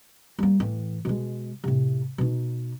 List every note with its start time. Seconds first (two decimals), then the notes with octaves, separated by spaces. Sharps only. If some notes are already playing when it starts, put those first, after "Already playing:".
0.39 G3 A#3
0.60 A2 E3
1.05 B2 G#3
1.64 A2 C3
2.18 B2 D#4